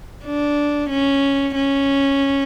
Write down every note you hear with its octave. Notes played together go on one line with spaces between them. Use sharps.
D4
C#4
C#4